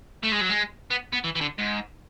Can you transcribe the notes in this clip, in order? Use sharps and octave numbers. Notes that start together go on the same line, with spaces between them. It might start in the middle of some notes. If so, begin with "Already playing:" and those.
A3
G#3
F#3
G#3
B3
B3
E3
E3
D3
G#2